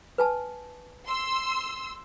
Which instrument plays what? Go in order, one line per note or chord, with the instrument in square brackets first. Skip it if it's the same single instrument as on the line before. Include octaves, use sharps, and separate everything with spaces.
[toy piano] B4 G#5 A5
[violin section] C6 E6